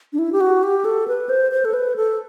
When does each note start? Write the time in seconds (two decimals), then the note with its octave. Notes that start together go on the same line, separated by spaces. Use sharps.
0.13 D4
0.19 E4
0.33 G4
0.41 F#4
0.63 G4
0.85 A4
1.08 B4
1.29 C5
1.52 C5
1.65 A4
1.73 B4
1.96 A4